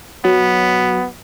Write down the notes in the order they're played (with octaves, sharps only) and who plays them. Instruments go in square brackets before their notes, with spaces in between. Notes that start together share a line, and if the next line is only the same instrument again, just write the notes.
[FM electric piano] F#3 [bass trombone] B3